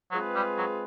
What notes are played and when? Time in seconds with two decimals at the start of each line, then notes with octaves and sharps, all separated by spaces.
0.11 F#3 G#3 C4 F4 G#4 B4
0.35 G3
0.58 F#3